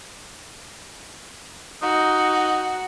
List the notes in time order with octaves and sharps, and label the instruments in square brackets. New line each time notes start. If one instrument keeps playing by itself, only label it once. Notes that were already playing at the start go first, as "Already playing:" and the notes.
[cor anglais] D#4 [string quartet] F#4